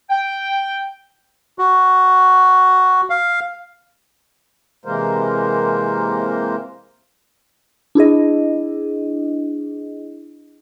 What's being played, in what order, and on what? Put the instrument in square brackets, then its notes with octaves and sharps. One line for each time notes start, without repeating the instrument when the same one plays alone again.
[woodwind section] G5
[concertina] F#4
F5
[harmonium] C3 E3 G#3 A#3 A#4 C5
[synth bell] D4 E4 G#4 D#5